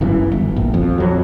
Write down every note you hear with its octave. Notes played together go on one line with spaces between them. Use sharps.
G1 F#2 E3
G1
A#1
F2
F2 F#3